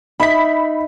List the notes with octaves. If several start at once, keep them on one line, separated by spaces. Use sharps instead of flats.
D#4 E5 B5 B6